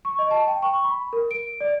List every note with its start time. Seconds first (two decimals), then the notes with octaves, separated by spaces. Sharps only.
0.05 C#6
0.19 D#5
0.31 A5
0.47 G5
0.62 C#6
0.84 B5
1.13 A#4
1.31 D7
1.61 D5